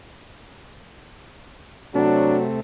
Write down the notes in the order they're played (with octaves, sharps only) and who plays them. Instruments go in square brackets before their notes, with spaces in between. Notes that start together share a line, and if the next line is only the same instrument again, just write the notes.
[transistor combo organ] C3 A3 [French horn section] F#3 F#4 [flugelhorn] D4